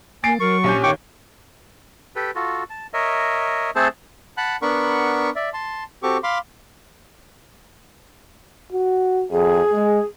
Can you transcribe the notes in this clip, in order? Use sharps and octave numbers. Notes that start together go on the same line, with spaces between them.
A#3 G#5 A6 C7 D7
F#3 A#4 C#6
A#1 C#4 G4 G6
D#2 D#3 C#5 G5 C#6 D6
G4 A4 B4
F4 F#4 A4
A5
A#4 C#5 D#5 E5
A3 C4 G#4 A4 C5 A5
F#5 A5 B5 F#6
B3 D4 A#4 F#5 B5 C#6
D5 E5
A5 C6
C4 F#4 G4 A4 C#6 D6
F5 B5 C6 D6
F#4
F2 G#4
G#3